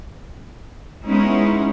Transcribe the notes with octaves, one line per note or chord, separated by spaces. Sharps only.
G#3 B3 C#4 D#4 E4